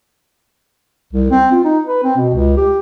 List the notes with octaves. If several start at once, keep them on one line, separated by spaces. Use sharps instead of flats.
C2
C4
F4
D#4
B4
C4
B2
C#2
G4